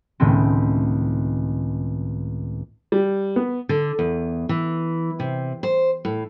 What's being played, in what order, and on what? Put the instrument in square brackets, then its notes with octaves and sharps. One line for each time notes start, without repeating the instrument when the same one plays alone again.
[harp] C#2 A2 D#3 A3 B3 C4
[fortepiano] G3
B3
[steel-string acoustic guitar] D3
E2
E3
C3
C5
A2